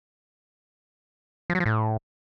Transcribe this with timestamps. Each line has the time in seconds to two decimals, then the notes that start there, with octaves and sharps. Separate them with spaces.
1.50 F3
1.55 F#3
1.60 F3
1.66 A2